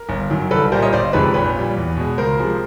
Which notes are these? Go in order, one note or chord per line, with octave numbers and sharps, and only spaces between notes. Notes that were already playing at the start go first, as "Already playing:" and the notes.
Already playing: A#4
G1
F#2 D#3 F#3
C2 A4 B4
A#2 G3 A#4 C5
C#5 D#5
G1 C5 D5
F2 C3 D#3 G#3 B4 C#5
A#1 B4 C#5
A#2 G3
E2
B2 G#3
C#2 A#4 C5
C3 F3 G#3